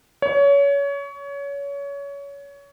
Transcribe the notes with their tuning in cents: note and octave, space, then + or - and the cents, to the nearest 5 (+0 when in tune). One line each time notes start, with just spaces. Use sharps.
C#5 +25